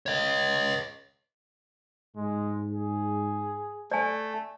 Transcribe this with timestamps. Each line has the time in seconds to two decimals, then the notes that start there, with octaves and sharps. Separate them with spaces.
0.06 C#5 D#5
2.16 G#2 G#3
2.72 G#4
3.92 A3 D5 G#5